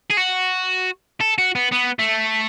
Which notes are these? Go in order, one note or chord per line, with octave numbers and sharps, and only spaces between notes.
G#4
F#4
A4
F#4
B3
B3
A3